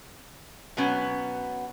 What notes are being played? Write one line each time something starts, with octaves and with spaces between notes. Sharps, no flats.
B2 F#3 B3 C#4